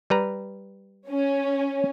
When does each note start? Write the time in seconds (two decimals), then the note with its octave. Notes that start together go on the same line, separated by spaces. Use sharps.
0.10 G3 B4 A#5
1.09 C#4